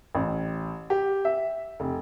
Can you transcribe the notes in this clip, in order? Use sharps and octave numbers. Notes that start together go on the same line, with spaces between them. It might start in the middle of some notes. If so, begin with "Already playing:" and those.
A1
G4
E5
F1